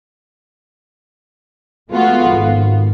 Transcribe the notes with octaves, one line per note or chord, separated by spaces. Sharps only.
G#3 A3 B3 F4 F#4
G#1